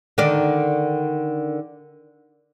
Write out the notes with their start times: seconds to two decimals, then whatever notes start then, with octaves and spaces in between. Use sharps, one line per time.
0.18 D3 D#3 D5